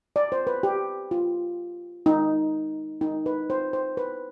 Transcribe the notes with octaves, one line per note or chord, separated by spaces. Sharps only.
D5
C5
B4
G4
F4
D#4
D#4
B4
C5
C5
B4